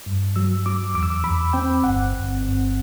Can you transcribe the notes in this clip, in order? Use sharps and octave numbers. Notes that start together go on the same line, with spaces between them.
G2
F#3 E6
F#3 D6
E2 D6
E6
D6
E2 B5
C4 G5
G1 F#5
G1
G1